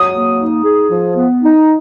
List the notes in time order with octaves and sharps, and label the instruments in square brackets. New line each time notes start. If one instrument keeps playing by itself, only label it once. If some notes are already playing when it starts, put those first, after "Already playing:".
Already playing: [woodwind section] F#3 [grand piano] D#6
[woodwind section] A#3
D#4
G#4
F3
B3
D#4